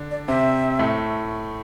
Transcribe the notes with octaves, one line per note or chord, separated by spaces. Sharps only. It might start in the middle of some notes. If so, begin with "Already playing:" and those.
Already playing: D3 D4
D5
C3 C4 E5
A2 A3